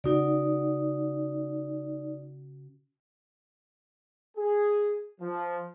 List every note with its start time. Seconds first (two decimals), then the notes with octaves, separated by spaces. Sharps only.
0.04 C#3 D#4 F#4 D5
4.37 G#4
5.21 F3